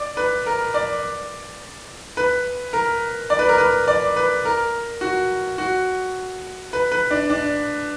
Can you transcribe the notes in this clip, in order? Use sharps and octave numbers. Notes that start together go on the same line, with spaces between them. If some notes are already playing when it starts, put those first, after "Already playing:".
Already playing: D5
B4
A#4
D5
B4
A#4
D5
B4
A#4
B4
D5
B4
A#4
F#4
F#4
B4
B4
D4
D4